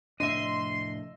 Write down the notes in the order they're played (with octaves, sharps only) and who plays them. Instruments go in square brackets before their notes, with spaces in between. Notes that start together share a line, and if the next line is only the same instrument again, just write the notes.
[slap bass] F1 A2 D4 [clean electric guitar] D#5 E5 [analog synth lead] C6